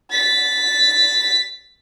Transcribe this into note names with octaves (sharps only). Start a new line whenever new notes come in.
A6 B6